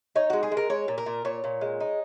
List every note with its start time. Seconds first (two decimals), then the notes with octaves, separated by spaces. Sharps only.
0.16 D#4 C#5
0.30 G#3 F#4
0.43 G#4
0.52 G#3
0.57 A#4
0.70 G#3 C#5
0.88 A#2
0.98 A#4
1.06 A#2
1.25 A#2 C#5
1.44 A#2
1.61 G#3
1.80 D#4